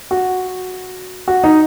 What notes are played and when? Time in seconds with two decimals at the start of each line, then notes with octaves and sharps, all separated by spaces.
0.11 F#4
1.28 F#4
1.44 D#4